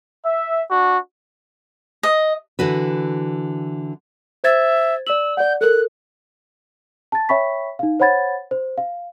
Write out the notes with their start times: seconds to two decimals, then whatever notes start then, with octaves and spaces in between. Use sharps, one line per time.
0.24 E5
0.69 D4 F#4
2.03 D#5
2.59 D3 E3 F#4 B4
4.44 C5 E5 G#6 A6
5.07 D5 E6 F#7
5.37 D5 F#5 G6
5.61 A4 A#4 F#6
7.12 A5 A6
7.29 C#5 E5 G5 B5 C#6 B6
7.79 D#4 F5
8.00 C5 C#5 F#5 B5 G#6 A6
8.51 C5
8.78 F5